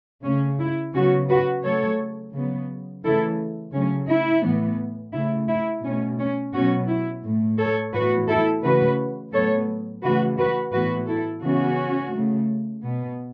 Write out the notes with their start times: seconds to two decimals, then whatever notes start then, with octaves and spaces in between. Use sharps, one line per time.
0.25 C#3 A3 C#4
0.60 E4
0.95 C#3 F#3 B3 C#4 F#4
1.30 F#4 B4
1.64 C#3 F#3 A3 A4 C#5
2.34 C#3 F#3 B3
3.05 C#3 E3 A3 E4 A4
3.74 C#3 F#3 A3 C#4
4.09 E4
4.44 A2 E3 B3
5.14 C#3 A3 E4
5.49 E4
5.84 B2 A3 C#4
6.19 C#4
6.53 B2 F#3 B3 C#4 F#4
6.89 E4
7.24 A2 A3
7.59 A4 C#5
7.94 A2 E3 B3 F#4 B4
8.29 E4 A4
8.64 C#3 E3 A3 F#4 B4
9.33 A2 F#3 B3 A4 C#5
10.03 C#3 E3 A3 F#4 B4
10.39 F#4 B4
10.73 A2 E3 B3 F#4 B4
11.08 E4 A4
11.43 C#3 E3 B3 C#4 F#4
12.13 C#3 A3
12.83 B2 B3